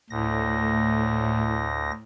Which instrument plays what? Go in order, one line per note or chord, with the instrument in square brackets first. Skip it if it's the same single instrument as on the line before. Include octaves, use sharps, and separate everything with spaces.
[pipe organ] D2 A#6 [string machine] A2